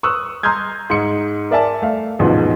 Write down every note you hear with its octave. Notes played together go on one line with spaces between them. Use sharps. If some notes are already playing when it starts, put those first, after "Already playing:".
C#6 D#6 E6 F#6
A#5 C6 D#6 F6 G6 G#6
G#2 C6 C#7
A#4 D5 E5 G#5 A5
A3 F5
A1 D#2 G#2 B2 F3